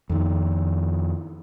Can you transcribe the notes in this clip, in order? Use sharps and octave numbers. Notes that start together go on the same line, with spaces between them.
F2 D#3